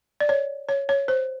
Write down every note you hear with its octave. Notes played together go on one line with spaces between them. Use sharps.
D5
C#5
C#5
C#5
C5